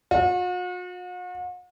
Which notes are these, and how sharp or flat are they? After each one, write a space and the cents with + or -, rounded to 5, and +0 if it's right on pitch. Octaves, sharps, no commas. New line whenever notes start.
F#4 -45